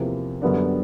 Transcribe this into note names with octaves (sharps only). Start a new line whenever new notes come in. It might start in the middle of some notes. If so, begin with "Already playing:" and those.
Already playing: E2 C3 F3 A#3
F#2 D3 G3 B3 D4